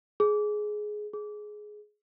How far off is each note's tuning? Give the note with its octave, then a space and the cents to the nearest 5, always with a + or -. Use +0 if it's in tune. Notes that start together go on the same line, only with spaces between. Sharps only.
G#4 +15
G#4 +15